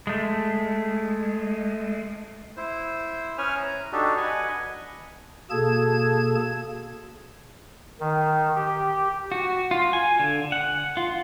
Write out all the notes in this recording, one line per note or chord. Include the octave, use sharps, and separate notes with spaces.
G#3 A3
E4 C5
C#4 B4 C#5 G#5 D#6 F6
A#5
D4 D#4 F#4 G4 A4
B4 D#5 F#5 G#5
B2 A#3 G#4 A4 A5 G#6
D#3
G4
F#4
F4
G#5
D3
F#5
F4